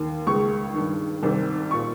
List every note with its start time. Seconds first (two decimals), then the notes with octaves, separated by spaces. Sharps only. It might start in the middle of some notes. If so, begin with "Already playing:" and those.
Already playing: D#2 D#3
0.27 C#2 C#3 C#6
0.74 G2 D#3
1.23 C2 C3 D#3
1.71 A#2 C#6